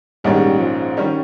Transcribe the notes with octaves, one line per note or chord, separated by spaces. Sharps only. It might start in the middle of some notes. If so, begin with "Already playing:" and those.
A#1 G#2 D#3 G3 G#3 C#4
F3
D#3 G3 C#4